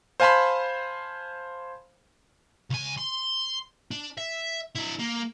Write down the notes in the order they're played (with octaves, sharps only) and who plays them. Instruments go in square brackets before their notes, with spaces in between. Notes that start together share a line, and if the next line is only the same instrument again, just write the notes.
[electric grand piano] C5 F5 G#5 A5 B5 C6
[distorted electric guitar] C#2 G#5
C6
D4
E5
D4 E4
A#3